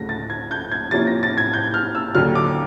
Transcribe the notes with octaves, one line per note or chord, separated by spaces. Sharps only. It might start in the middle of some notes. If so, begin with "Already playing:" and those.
Already playing: D2 C#3 F#3 A3 A#6
A6
G#6
G6
G#6
C3 F3 A#3 C#4 E4 A6
A#6
A6
G#6
G6
F6
E6
D#2 D3 F#3 F6
D6